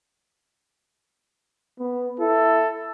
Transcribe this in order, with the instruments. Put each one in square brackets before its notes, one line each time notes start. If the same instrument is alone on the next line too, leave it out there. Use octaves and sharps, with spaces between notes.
[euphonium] B3
[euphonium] E4 [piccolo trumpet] A4